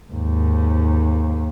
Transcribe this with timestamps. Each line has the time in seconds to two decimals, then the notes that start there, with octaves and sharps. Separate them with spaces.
0.12 D#2 G#2